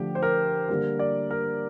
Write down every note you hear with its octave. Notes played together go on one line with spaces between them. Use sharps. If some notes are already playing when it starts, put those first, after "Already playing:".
Already playing: D3 F3 A3 G4
C5
A#4
D3 G3 A#3 A#4
D5
A#4